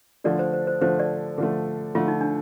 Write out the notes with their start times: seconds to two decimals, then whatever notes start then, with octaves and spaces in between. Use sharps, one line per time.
0.24 D3 F3 A3 D5
0.39 C5
0.53 C5
0.67 C5
0.81 D3 F3 A3 C5
0.99 D5
1.38 D3 F3 A3
1.95 D3 F3 A3 F4
2.08 D#4
2.21 D4